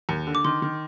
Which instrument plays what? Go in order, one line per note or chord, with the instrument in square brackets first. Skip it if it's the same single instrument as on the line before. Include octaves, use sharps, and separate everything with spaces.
[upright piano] D#2
D3
[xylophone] D6
[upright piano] D#3 [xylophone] C6
[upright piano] D#3